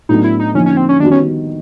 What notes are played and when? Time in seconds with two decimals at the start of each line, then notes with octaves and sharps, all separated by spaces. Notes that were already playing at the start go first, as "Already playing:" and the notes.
0.09 A2 F#3 B3 D4 D#4
0.24 E4
0.40 D#4
0.54 D3 F3 A#3 C#4 D#4
0.66 C#4
0.77 C4
0.89 C#4
1.00 D#3 G3 B3 D4 D#4 F#4
1.11 C#4